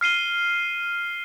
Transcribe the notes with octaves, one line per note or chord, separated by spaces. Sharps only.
F6 C7 D#7 G7